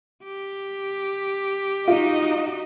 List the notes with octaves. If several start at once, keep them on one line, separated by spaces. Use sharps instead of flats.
G4
D#4 F4 F#4 D#5